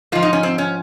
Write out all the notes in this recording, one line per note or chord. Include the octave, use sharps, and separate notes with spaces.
G#2 F3 F4
D#4
C#4
C4
C#4